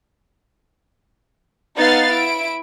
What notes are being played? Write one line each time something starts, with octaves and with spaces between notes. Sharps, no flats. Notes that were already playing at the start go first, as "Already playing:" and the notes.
B3 D#4 F5 A6 C7
E4 D7